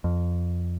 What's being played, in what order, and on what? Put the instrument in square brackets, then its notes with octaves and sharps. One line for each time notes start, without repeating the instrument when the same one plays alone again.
[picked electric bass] F2